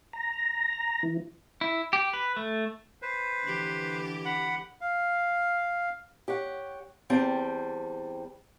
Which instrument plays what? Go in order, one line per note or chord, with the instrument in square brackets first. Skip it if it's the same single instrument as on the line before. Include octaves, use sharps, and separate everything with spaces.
[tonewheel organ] A#5
E3
[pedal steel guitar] E4
G4
B4
A3
[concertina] B4 C5
[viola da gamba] D3 E3 G4
[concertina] F#5 B5
[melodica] F5
[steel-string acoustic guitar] G4 C#5 F#5
E2 G3 C4 G5 A5